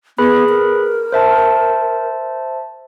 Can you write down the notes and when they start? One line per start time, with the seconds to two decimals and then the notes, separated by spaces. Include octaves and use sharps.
0.18 B3 G#4 B4 B5
0.49 A#4
1.12 C5 E5 A5